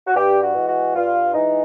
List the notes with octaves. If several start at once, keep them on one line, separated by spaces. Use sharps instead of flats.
F#4
G2 G4
F#4
E3 G#3
F#4
G2 F4
E3 G#3 D#4